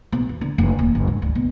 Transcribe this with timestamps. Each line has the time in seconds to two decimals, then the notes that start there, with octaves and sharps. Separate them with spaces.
0.12 B1
0.29 E2
0.41 D3
0.58 F1
0.79 D#1
0.95 F#1
1.07 G#2
1.22 D2
1.35 B2